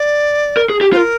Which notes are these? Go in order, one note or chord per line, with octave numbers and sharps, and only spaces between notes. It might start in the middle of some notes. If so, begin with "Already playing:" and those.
Already playing: D5
A#4
G#4
G4
F4 C5
A#4